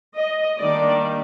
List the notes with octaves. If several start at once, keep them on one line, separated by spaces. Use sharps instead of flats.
D#5
D#3 G3 A#3 D4 D5